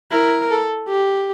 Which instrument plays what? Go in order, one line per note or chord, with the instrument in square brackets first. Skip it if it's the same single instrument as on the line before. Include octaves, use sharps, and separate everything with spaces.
[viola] E4 [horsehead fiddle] A#4
[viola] A4
G4